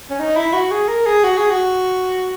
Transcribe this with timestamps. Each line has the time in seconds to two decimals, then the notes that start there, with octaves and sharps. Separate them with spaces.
0.10 C#4
0.19 D#4
0.37 E4
0.53 F#4
0.71 G#4
0.88 A#4
1.06 G#4
1.24 F#4
1.37 G#4
1.50 F#4